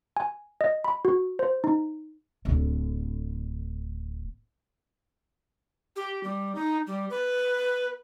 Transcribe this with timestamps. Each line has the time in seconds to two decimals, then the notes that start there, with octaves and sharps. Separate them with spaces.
0.17 G#5
0.61 D#5
0.84 B5
1.05 F#4
1.39 C5
1.64 D#4
2.45 D1 D3
5.96 G4
6.24 G3
6.55 D#4
6.87 G3
7.10 B4